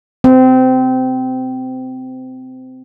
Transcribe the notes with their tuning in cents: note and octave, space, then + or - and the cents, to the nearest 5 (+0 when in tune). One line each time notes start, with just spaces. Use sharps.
C4 -20